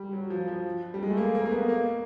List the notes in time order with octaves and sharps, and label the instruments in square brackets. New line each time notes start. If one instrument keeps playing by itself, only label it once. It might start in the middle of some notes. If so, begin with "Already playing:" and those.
Already playing: [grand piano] G3
F#3
F3
F3
G3
G#3
A3
A#3
A#3
A#3
B3
A#3